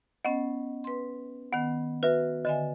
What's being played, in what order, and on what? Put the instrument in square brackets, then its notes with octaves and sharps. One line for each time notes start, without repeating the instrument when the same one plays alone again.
[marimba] B3 C#4 [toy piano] D#5 F#5
[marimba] B4 C6
[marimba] D#3 B3 [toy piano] F#5
[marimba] F#4 [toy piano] B4 E5
[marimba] D3 E5 G#5 [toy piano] D#5